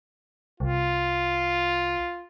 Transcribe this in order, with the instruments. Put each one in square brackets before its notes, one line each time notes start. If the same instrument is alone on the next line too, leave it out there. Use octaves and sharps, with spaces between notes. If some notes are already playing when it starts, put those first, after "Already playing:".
[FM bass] C2 [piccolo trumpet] F4